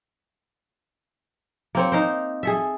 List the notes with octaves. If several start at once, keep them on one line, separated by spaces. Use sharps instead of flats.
A#3 C4 C#5
D#4 A#4 C5
G#4 A4 E5